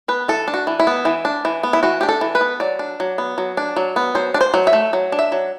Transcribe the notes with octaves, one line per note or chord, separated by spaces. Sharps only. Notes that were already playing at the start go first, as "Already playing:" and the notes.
B3 B4
E3 A4
D4
F#4
E3
E4
B3
E3
D4
E3
B3
E4
E3 F#4
D4 G4
A4
E3
B4
B3
F#3 D5
D4
F#3
B3
F#3
D4
F#3
B3
F#3 C5
D4
C5
F#3
E5
A3
F#3
D4
E5
F#3